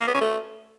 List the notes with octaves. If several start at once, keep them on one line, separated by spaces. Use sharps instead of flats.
A#3
B3
C#4
A3